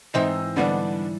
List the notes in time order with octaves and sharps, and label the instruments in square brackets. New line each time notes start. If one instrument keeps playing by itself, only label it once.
[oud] G#2 E3 E5 [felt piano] C4 C5 D#5 [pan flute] D#4
[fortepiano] D3 B3 D4 [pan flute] G3